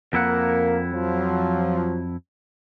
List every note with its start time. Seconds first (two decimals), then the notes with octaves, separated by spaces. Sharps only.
0.13 F2 A#3 E4 A#4 F#5
0.93 F3 F#3